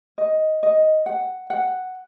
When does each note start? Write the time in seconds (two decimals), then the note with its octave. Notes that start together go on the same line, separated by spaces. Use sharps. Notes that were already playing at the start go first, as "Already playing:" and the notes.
0.18 D#5
0.63 D#5
1.06 F#5
1.50 F#5